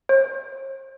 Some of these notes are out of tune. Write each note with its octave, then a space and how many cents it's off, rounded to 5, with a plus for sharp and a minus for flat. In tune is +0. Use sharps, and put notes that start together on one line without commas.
C5 +45